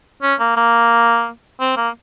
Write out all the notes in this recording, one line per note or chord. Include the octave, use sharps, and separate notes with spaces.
C#4
A#3
A#3
C4
A#3